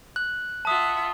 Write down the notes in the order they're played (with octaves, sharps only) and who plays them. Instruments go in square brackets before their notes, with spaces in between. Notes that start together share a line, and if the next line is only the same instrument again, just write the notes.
[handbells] F#6
[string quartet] F4 E5 F#5 [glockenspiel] A5 D#6